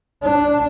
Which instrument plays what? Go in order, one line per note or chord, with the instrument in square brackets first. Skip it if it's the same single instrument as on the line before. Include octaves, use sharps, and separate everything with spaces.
[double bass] D4